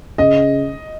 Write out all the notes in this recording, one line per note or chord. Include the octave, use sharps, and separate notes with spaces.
C#3 D#5